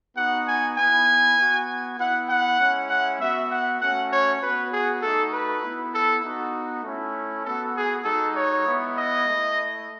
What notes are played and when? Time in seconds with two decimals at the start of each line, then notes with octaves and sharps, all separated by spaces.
0.16 B3 D#4 F#4 F#5
0.46 G#5
0.77 B3 E4 G#5
1.38 B3 F#4
1.98 B3 E4 F#5
2.28 F#5
2.59 G#3 C#4 E4
2.89 F#5
3.19 B3 F#4 E5
3.50 F#5
3.80 A3 C#4 F#4 F#5
4.11 C#5
4.41 B3 F#4 B4
4.71 G#4
5.01 A3 D#4 F#4 A4
5.32 B4
5.62 B3 E4
5.92 A4
6.23 B3 D#4 F#4
6.83 A3 C#4 E4
7.44 B3 F#4 A4
7.74 G#4
8.04 G#3 D#4 F#4 A4
8.35 C#5
8.65 G#3 B3 E4
8.95 D#5
9.26 A3 E4